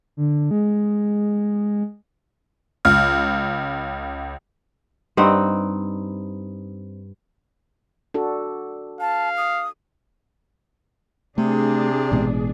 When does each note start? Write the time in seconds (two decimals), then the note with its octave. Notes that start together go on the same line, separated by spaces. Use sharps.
0.17 D3
0.51 G#3
2.85 C#2 F6
5.17 G2 C4 D#4 F#5
8.14 D4 F#4 A4
9.01 F5 A5
9.37 D#6
11.38 C3 A3 D4 G#4
12.12 A1 B2 G#3